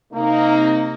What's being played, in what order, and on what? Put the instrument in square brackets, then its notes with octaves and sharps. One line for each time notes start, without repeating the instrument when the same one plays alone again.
[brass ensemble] C3 A#3 D#4